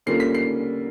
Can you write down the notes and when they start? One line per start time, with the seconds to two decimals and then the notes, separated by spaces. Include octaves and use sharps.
0.06 D3 G3 A#3 C#4 F4 C7
0.20 B6
0.35 C7